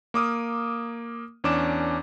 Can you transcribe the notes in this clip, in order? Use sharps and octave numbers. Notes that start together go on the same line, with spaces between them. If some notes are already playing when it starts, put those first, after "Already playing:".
A#3 D6 D#6 F6
E2 C#4 D4 D6 E7